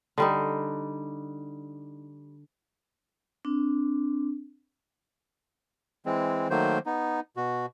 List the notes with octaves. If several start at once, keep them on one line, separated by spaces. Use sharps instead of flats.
D3 G3 D#4
C4 D4
E3 G#3 C4
D#3 F#3 A3 A#3 C5
B3 D#4
B2 F#4